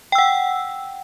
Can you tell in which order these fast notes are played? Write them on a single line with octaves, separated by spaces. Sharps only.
G5 E6 F#5